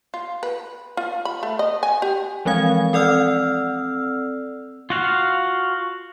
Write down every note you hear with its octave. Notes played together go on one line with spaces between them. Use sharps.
F4
B4
F4
B5
A3
D#5
G#5
G4
E3 F3 G#3 C4 F5 G#6
C4 A4 D5 F#5 E6 F6
F4 F#4 F5